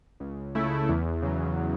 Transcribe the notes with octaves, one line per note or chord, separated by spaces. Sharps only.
C#2
C#3 A3 E4
E2
C#3 F#3